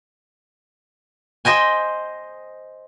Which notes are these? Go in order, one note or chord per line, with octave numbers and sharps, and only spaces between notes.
C5 D#5 G5 G#5